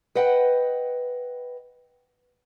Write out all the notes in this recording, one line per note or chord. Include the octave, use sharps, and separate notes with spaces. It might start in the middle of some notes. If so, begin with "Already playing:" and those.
B4 D#5 F#5 G5